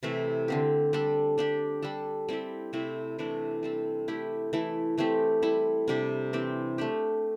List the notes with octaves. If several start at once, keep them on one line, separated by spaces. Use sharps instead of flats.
C3 E3 A3 E4
D3 C4 G4
G3 D4 A4
G3 D4 G4
G3 D4 A4
G3 C4 E4 G4
C3 A3 C4 E4
C3 E3 A3 D4
G3 C4 A4
A3 E4 G4
E3 A3 E4 A4
E3 A3 C4 G4
G3 E4 A4
C3 G3 D4 G4
E3 C4 G4
A3 D4 G4